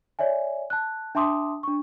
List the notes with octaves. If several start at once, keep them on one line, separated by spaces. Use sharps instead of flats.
C#5 D5 E5 G#5
A5 F#6
D4 E5 A5 C6 D6 D#6
D4 C#6